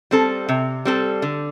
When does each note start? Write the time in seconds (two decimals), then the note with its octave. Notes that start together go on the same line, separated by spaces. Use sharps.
0.11 G3 C4 A4
0.49 C3
0.85 G3 C4 A4
1.22 D3